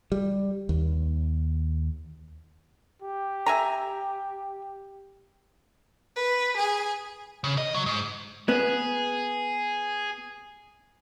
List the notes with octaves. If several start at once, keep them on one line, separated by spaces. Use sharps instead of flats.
G3
D#2
G4
E5 G#5 A#5
B4
G#4
C#3
D#5
F#3
G#2
B3 G#4